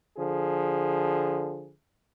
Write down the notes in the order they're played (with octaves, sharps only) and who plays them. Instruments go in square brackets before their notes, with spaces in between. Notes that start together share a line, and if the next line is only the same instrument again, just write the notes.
[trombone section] D3 F3 G#4